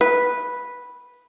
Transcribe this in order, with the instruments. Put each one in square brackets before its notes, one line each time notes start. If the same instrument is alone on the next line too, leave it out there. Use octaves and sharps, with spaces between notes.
[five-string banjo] B4